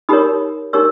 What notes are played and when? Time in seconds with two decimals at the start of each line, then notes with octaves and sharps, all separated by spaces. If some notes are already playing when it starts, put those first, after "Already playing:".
0.09 D#4 G4 A#4 C#5 B5 D#6
0.73 D#4 G4 A#4 C#5 C#6 E6